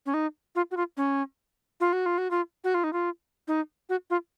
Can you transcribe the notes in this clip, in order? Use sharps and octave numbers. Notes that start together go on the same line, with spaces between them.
C#4
D#4
F4
F#4
F4
C#4
F4
F#4
F4
F#4
F4
F#4
F4
D#4
F4
D#4
F#4
F4